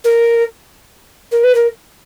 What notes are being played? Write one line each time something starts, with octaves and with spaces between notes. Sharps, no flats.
A#4
A#4
B4
A#4